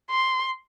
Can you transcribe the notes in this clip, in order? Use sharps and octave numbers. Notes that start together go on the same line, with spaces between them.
C6